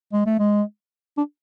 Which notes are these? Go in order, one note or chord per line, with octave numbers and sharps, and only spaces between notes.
G#3
A3
G#3
D4